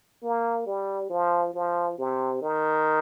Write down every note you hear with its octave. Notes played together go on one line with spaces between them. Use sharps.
A#3
G3
F3
F3
C3
D#3